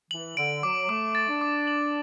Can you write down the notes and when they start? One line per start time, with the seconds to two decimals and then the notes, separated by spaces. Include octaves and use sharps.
0.11 E3 F#7
0.37 D3 D7
0.63 F#3 D6
0.89 A3 D6
1.15 A6
1.28 D4
1.41 D6
1.67 F#7